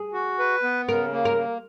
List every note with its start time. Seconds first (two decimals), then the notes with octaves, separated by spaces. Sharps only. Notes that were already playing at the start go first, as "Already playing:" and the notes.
Already playing: G#4
0.13 F#4
0.39 B4
0.63 B3
0.88 C#3 A#4
1.13 A#3
1.25 A#4
1.37 A#3